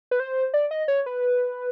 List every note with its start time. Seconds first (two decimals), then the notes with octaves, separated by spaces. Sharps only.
0.11 B4
0.20 C5
0.54 D5
0.71 D#5
0.88 C#5
1.06 B4